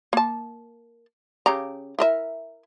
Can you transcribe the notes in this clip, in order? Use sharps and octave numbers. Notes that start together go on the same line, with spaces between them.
A#3 A5
C#3 G4 A#5
E4 A#4 E5